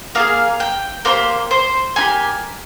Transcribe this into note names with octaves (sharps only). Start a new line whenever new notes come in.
A#3 F4 G#4 F5
G5
A#3 D#4 G4 C5
C5
A#3 D#4 G4 G#5